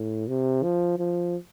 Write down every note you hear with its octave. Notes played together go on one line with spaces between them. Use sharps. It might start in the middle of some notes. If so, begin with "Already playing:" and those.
Already playing: A2
C3
F3
F3